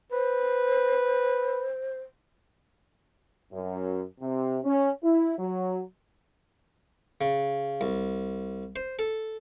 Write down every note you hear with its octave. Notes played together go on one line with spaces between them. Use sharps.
B4 C5
F#2
C3
C#4
E4
F#3
C#3
C2
C5
A4